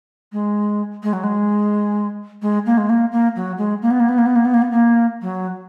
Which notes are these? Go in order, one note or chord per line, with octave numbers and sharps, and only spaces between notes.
G#3
G#3
F#3
G#3
G#3
A#3
G#3
A#3
A#3
F#3
G#3
A#3
B3
A#3
B3
A#3
B3
A#3
B3
A#3
B3
A#3
F#3